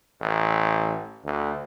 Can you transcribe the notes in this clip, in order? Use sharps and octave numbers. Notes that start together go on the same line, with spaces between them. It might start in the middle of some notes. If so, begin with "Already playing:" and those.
A1
D2